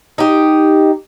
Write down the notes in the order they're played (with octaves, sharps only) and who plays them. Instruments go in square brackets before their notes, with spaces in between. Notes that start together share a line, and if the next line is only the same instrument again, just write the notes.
[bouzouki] D#4 G4